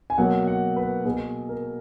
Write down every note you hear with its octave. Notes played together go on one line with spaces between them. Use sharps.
G#5
B2 F#3 A#3 F#5
F#5
B4
B2 A#3 G#4
A#4